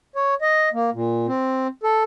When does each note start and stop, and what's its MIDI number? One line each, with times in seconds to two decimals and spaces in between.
0.16 0.34 73
0.42 0.69 75
0.73 0.90 58
0.94 1.27 46
1.27 1.67 60
1.84 2.03 69